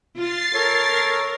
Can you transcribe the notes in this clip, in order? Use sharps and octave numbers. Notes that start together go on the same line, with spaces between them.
F4 A6 C7
A4 A#4 C#5